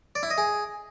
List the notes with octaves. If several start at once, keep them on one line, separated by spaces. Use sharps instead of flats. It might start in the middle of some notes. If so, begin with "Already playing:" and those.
D5
E4
D#5
G#4